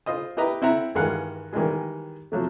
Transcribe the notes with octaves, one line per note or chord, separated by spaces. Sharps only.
F4 C5 D#5 D#6
E4 G4 B4 D#5 A#5
C4 E4 F#5 A#5
G2 D#3 E3 G#3 F5 F#5
D#3 E3 G3 G#3 G#4
C3 F3 F#3 A3